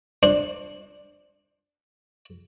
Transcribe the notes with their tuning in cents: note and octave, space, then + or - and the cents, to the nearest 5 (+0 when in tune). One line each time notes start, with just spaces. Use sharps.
D4 +0 C5 +20